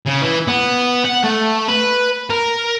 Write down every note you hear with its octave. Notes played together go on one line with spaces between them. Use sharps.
C#3
E3
B3
F#5
A3
B4
A#4